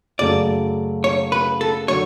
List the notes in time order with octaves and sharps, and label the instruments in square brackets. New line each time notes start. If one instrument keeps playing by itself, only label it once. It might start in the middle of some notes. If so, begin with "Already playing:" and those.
[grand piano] F#2 C#3 F#3 A3 [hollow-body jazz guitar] D5
[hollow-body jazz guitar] C#5
B4
A4
[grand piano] D3 F#3 [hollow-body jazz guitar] C#5